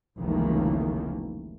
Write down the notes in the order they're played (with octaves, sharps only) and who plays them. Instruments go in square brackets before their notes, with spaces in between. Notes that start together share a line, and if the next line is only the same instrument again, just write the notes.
[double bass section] F1 C#2 D#3 E3 A3 A#3